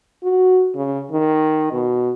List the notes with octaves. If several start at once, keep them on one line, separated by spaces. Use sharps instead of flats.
F#4
C#3
D#3
B2